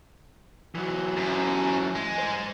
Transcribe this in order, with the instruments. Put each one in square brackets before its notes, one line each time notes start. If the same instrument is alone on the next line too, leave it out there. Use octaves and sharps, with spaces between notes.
[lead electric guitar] E3 F#3
[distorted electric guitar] F#2
G#3
[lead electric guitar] G#2 C5